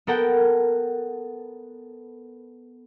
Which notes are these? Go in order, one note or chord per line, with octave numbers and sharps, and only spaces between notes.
B3 A4 A#4 F#5 G5